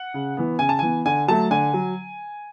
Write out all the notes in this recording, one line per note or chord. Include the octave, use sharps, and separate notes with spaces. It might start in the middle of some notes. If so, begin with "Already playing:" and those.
Already playing: F#5
C#3
E3 B3
C#3 G#5
A5
E3 B3 G#5
D3 G#5
F#3 A3 A5
D3 G#5
F#3